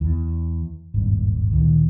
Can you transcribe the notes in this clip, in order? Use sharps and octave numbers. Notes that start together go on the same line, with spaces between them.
E2 E3
D#1 G#1 G2
D2 A#2 D#3 E3